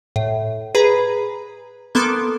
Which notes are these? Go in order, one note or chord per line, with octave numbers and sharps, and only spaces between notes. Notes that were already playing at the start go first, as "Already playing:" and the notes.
A2
G#4 B4 A#5 B5
A#3 B3 A4 C6 D6 D7